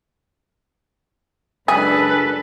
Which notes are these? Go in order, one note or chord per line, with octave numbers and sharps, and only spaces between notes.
C#2 F#2 G#3 D4 G#4 A4 B4